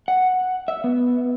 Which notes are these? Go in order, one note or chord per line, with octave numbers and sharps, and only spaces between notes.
F#5
E5
B3